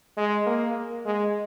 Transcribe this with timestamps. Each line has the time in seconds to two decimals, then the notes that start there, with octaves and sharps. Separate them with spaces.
0.17 G#3
0.47 A#3
1.05 G#3